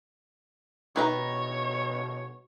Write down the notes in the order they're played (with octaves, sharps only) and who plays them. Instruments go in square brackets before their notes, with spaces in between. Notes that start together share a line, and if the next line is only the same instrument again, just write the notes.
[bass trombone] B2 [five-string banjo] D#3 B4 A#5 [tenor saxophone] C#5